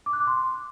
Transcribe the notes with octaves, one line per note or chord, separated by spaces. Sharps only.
D6
F#6
D6
C6